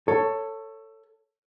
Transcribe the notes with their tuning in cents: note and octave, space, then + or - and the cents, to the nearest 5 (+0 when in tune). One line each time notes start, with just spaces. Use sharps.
A4 +15 C#5 +0